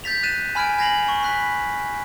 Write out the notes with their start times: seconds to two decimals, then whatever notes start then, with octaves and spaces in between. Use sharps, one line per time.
0.04 G6 A6 B6 F7
0.23 F#6 A6 D#7 E7
0.55 G#5 B5 F6 G#6 D7
0.78 G#5 G#6 A#6 C7 F7 F#7
1.08 C#6
1.23 B5 F#6 B6